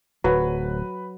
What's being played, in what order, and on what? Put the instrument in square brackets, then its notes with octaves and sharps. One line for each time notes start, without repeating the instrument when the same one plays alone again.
[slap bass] D1 [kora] F#3 [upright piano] B4